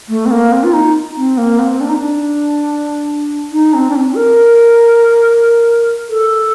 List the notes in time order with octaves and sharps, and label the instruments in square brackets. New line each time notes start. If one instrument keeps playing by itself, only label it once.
[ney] A3
C4
A#3
C4
F4
D#4
C4
A#3
C4
D4
D#4
D4
D#4
C4
D4
C4
A#4
A4